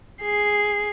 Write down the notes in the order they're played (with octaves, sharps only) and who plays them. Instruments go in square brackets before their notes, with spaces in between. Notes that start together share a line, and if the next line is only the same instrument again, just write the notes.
[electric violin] G#4 C7